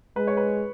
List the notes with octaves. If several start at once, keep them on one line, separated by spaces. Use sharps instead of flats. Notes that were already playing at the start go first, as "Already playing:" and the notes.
G#3 B4
C#5
B4